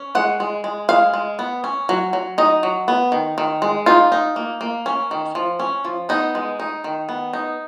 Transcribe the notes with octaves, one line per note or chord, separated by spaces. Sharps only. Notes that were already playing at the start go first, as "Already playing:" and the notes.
Already playing: C#4
G#3 F#5
G#3
G#3
G#3 F5
G#3
B3
C#4
F#3
F#3
D#4 D#5
F#3
B3
D#3
D#3
G#3
D#4 F4
D#4
A#3
A#3
C#4
D#3
F3
C#4
F3
B3 D#4
G#3
D#4
D#3
B3
D#4